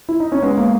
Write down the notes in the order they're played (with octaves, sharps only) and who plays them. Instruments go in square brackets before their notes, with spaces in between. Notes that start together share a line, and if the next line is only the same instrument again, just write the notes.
[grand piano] E4
D#4
C#4
[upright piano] G#3 [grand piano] B3
[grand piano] A#3